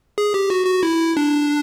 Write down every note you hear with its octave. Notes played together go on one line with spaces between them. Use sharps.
G#4
G4
F#4
F#4
E4
D4